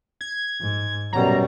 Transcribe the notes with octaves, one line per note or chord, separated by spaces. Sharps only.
G#6
G#2
F#2 B2 F#3 G3 A#5